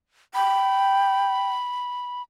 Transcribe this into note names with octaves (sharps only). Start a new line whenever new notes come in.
G5 B5